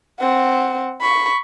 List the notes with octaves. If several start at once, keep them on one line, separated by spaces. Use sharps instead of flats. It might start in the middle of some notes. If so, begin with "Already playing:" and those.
C4 F#5
B5 C#6